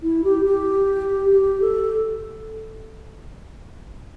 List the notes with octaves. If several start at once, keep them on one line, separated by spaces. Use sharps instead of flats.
E4
G4
G4
G4
A4